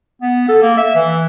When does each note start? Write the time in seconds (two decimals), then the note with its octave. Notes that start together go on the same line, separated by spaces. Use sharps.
0.22 B3
0.49 A4
0.62 A#3
0.77 E5
0.96 E3